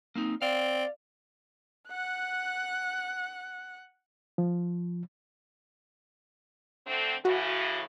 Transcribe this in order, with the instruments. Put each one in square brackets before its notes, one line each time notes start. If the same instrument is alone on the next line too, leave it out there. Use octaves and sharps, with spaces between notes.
[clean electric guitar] A#3 C4 D#4
[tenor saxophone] C4 [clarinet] D5 [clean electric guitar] F5
[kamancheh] F#5 F#6
[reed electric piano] F3
[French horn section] D3 A3 C4
[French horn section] A2 C#3 E3 [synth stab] F#4